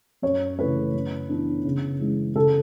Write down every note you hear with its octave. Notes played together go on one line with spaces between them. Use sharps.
F#2 C#5
C#3 E3 A3 B4
F#2
E3 B3 D4
C#3
E3 G#3 C#4
C#3 A4